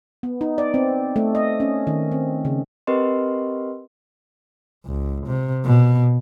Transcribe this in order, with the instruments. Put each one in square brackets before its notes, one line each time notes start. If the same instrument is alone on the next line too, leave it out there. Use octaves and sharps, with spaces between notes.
[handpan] B3
D#4
D5
C4
A3
D#5
C#4
D#3
C4
C#3
[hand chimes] C4 G4 A#4 B4 D#5 C6
[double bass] C#2
C3
B2